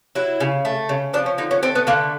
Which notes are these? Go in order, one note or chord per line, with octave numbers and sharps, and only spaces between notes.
F#3 E4
C#3
A3
C#3
F3 D4
C#4
D3 D#4
C#4
A3 C4
B3
D3 A#3